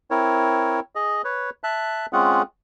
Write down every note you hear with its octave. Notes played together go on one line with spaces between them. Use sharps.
C4 E4 A#4 C#5
G#4 D#5
B4 C#5
E5 A5 F#6
G#3 C4 C#4 F4 G#4 F#5